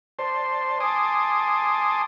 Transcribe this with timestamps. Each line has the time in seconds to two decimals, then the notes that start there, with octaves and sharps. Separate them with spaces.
0.19 C5 D5 A5 C6
0.80 G#5 A5 C6 D6 D#6